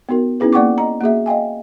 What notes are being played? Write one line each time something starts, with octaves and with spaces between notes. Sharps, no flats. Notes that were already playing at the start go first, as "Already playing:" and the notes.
B3 D#4 F#4 A#4
B3 C#4 D#4 E4 G#4 B4
A#3 D5 F#5 G5 C#6 D6
D#5 A#5
A#3 F#4 G#4 E5
D#5 F5 G5 G#5